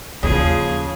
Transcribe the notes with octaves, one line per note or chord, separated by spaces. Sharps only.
D#2 C#3 F3 G#4